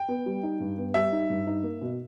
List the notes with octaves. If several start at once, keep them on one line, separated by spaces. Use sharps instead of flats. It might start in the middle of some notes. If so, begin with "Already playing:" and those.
Already playing: G5
B3
G3
D#4
G2
B3
G3 E5
D#4
G2
D#4
A#3
B2